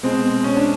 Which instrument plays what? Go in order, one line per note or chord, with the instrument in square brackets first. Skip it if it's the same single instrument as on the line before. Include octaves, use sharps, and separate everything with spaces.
[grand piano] B2 G#3 C4
C#4
D4